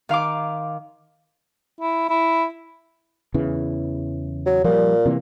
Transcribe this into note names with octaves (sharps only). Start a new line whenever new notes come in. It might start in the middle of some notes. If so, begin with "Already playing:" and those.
D#3 F5 C6 D6
E4
E4
E2 C#3 E3
F#3
A#2 F3 G3
C3 E3 A#3